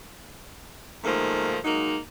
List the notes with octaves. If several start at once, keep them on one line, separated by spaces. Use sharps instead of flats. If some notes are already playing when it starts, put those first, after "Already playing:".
G#2 D#3 F3 A3 A#3
F#3 G#3 A#3 D#4